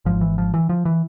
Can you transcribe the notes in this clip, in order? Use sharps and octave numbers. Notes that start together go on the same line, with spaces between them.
G#1 G#2 F3
E3
F3
E3
F3
E3